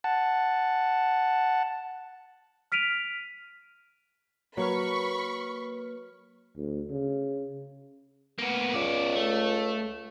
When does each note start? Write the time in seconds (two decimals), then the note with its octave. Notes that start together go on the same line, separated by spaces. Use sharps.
0.04 F#5 A5
2.72 F6 B6 D7 D#7 F7
4.57 F#3 A#3 B4 B5 C#6 F6
6.56 D2
6.90 C#3
8.38 A#3 B3
8.74 C#2 C#4 D5
9.15 A3